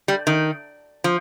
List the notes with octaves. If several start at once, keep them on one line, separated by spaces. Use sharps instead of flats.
G3
D#3
F3